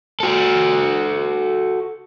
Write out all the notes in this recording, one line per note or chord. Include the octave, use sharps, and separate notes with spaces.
F#4 A4